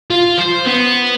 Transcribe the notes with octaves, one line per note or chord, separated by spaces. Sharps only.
F4
C5
B3